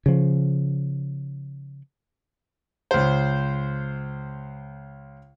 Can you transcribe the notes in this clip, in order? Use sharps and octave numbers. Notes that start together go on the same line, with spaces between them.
C#3 F3
C#2 C5